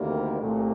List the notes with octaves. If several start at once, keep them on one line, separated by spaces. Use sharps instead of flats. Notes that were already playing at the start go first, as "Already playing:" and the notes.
Already playing: D2 C3 D#3 G3 A#3
C2 A#2 A3